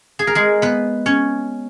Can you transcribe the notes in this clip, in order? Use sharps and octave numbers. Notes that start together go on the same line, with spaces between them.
G#4
A#4
G#3 G#4
B3 B4
C#4 C#5